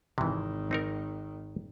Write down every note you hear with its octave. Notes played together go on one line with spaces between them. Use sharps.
G#1 C3 D#3 E3
C4 D#4 A#4